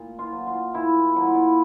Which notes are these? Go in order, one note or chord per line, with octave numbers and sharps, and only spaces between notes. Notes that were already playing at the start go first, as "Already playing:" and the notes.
Already playing: A#2
F4
F#3
F4
A#2 E4
F#3 E4
F4
E4